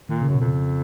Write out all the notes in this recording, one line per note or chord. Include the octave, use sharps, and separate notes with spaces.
A#2 D#3
C#3
F#2
B2
F2
C#3